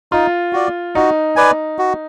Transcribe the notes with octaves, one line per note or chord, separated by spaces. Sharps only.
D#4 F4
F#4 D5
D#4 F#4
B4 D5 G#5
F#4